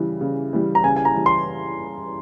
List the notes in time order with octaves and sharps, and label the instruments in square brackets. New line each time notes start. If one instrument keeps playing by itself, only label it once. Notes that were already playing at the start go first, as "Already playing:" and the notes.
Already playing: [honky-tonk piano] C#3 E3 G3
C#3
E3 G3
[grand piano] A#5
[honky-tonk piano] C#3 [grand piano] G#5
[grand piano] G#5
A#5
[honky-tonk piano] E3 G3
[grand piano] C6